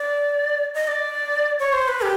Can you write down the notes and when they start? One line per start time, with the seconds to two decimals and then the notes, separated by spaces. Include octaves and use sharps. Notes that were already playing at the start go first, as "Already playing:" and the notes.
Already playing: D5
0.75 D#5
0.88 D5
1.60 C#5
1.73 C5
1.88 B4
2.02 G4